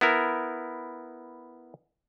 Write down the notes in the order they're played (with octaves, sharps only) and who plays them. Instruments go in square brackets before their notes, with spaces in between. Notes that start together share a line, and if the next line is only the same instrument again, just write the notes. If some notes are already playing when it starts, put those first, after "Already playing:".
[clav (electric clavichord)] B3 E4 A#4